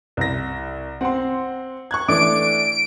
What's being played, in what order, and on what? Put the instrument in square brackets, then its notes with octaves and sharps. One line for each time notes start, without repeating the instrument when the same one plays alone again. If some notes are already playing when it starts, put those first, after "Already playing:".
[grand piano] C2 A#6
[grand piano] C4 [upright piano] F#5 C6
[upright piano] C#6 F#6 G#6
[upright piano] E3 A3 D4 [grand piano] D6 [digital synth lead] D7